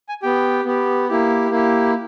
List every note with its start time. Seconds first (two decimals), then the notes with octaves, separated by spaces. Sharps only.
0.09 G#5
0.22 B3 G4 G5
0.65 B3 G4
1.09 A#3 E4 G4
1.51 A#3 E4 G4